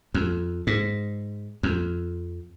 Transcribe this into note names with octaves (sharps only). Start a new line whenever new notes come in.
F2
G#2
F2